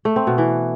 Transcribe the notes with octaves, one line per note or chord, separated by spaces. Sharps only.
A3
C4
B2
E3